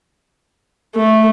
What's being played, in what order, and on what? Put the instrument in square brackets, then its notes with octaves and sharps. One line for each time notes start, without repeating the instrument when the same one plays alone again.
[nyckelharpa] A3